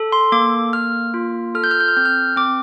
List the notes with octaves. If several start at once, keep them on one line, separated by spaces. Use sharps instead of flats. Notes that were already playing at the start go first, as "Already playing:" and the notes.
Already playing: A4
C6
A#3 D6
A#3 F6
F4
A4 F6
G6
F6
G6
F6
C4 G6
F6
C4 D6